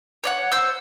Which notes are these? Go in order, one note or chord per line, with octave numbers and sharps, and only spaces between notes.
C#5 D5 F#5
C5 E6